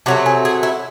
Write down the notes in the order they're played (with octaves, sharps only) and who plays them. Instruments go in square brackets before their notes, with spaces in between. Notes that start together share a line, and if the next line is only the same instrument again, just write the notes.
[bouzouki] C3 F#3 A3 F#4
G#4
G#4
E4